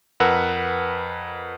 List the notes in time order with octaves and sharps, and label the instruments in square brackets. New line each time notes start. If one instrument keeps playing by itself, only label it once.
[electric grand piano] F2 A#4 B4 F#5 E6